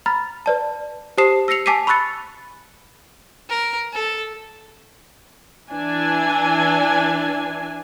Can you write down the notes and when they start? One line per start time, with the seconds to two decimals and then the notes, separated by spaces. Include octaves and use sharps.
0.06 A#5 B5 F6 A6
0.46 B4 D5 A5
1.18 G4 C5 A5 D#6 C7 E7
1.48 E6 A#6 C7 C#7 F7
1.66 G#5 A5 D6 B6 C7 D#7
1.87 B5 C#6 E6 F#6 A6 C#7
3.49 A#4
3.93 A4
5.71 E3 D4 G#5